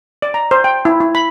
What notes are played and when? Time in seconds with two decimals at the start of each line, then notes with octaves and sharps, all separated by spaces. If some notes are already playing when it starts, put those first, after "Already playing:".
0.22 D5
0.34 A#5
0.51 C5
0.64 G5
0.85 E4
1.00 E4
1.15 B5